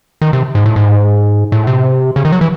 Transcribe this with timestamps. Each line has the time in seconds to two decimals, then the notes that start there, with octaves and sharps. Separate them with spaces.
0.22 D#3
0.33 C3
0.55 G#2
0.66 A2
0.76 G#2
1.52 A2
1.67 C3
2.16 C#3
2.25 D#3
2.32 F#3
2.41 E3